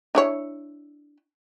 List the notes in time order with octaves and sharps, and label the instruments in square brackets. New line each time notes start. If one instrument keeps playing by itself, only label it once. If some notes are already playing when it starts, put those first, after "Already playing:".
[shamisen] D4 E4 C#5